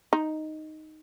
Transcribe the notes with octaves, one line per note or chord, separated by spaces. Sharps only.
D#4